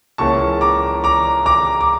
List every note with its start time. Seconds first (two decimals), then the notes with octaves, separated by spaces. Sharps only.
0.18 C#2 C#3 E3 A#3 C#4 A5 C#6
0.61 A#5 D6
1.04 A#5 D6
1.46 A#5 D6
1.81 D6